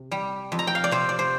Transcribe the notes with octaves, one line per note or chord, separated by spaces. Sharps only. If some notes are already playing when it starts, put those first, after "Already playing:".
Already playing: C3
G3
F2
A#5
G5
F5
D5
C3 C5
D5
C5